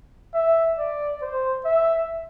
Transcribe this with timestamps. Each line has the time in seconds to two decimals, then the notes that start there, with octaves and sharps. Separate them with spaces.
0.34 E5
0.78 D5
1.22 C5
1.65 E5